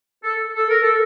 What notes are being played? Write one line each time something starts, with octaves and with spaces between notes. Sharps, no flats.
A4
A4
A#4
A4